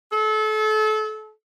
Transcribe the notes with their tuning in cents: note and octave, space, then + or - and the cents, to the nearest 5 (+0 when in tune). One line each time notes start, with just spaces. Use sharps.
A4 -30